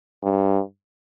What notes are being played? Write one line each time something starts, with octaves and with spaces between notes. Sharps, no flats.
G2